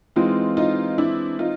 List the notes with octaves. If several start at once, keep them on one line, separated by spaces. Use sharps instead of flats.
E3 G#3 C4 D#4 F4
D#4 F4
D4 E4
D#4 F4